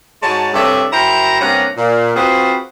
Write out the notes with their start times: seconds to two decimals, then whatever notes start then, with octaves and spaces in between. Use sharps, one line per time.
0.23 G#2 G#3 F#4 C#5 A5
0.54 G2 C3 A4 C#5 D5 E5
0.92 F#2 E4 C5 G5 A#5
1.41 G2 C3 A#3 C#4 F#5 A#5
1.77 A#2
2.16 C4 F4 F#4 G#4 B4 C5